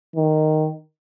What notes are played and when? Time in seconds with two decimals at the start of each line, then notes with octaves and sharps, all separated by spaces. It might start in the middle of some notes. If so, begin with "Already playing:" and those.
0.16 D#3